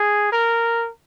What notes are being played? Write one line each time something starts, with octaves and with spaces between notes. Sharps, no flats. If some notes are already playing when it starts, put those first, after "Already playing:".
Already playing: G#4
A#4